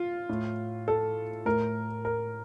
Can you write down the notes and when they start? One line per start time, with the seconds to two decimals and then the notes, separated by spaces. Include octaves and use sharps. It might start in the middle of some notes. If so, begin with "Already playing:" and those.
Already playing: F4
0.29 A2
0.88 A4
1.45 A2 A#4
2.05 A#4